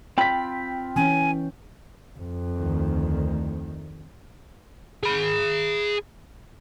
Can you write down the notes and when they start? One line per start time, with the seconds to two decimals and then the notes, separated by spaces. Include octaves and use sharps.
0.18 C4 F4 G5 B5 B6
0.96 E3 C#4 G#5
2.19 F2
2.55 D2 D#3
5.03 G#4 B5